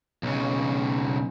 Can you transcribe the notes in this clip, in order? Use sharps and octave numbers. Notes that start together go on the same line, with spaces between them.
B1 C#3